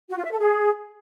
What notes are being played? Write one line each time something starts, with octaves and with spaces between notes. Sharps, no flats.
F#4
F4
E5
A4
G#4